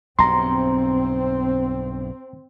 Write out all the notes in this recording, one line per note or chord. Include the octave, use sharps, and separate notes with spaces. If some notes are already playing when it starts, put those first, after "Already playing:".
B1 G2 C4 A#5 C6